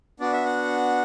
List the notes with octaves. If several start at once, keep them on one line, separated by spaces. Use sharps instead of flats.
B3 D4 F#4 D5
E5
F#5